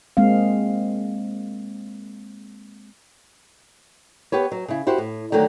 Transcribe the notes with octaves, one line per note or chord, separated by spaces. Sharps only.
G#3 A#3 C4 F5
B3 G4 B4 C#5
F#3
C#3 E4
E4 F#4 G4 C5
A2
D3 D#3 F#3 A3 F#4